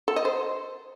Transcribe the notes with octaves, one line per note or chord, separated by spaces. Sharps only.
A4
D#5
C5